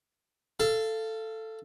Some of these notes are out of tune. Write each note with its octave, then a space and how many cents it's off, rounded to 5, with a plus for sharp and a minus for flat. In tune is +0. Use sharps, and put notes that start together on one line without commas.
A4 +5 F5 -20